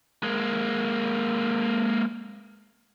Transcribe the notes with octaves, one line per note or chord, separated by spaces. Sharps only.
G#3 A#3